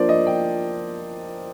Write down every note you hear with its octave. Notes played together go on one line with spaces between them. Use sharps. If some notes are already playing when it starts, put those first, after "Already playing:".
Already playing: F3 A#3 D4 C5 D5
D#5
G5